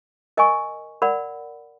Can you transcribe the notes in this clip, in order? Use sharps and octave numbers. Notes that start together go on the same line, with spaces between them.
A#4 D#5 G#5 C#6
A#4 D5 F#5 B5